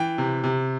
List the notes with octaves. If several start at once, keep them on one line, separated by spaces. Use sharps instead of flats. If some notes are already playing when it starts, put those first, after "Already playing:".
Already playing: E3 G5
C3
C3